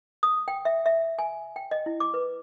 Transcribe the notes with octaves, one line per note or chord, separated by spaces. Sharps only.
D#6
G5
E5
E5
G#5
G5
D#5
E4
D6
B4